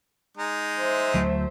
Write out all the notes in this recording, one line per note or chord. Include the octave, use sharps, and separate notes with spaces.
G#3 D#4
C5 E5
D2 F#3 A3